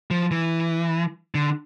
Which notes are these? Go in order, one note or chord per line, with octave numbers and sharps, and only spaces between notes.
F3
E3
D3